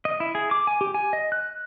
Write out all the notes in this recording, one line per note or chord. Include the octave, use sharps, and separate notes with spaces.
D#5
E4
G#4
D6
G#5
G4
G#5
D#5
F#6